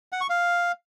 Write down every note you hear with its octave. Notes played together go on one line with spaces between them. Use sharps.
F#5
C#6
F5